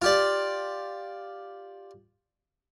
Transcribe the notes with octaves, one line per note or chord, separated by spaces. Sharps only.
F4 G4 D5